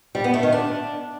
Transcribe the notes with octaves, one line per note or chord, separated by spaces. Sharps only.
G3
B3
A3
D#3
D4